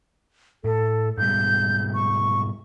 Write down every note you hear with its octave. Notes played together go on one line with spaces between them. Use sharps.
A2 A4
G#2 B2 G3 G6
C#6